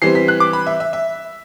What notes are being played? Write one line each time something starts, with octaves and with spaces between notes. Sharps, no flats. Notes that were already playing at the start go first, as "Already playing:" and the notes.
E3 G3 C4 C7
B6
F#6
D6
B5
E5
E5
E5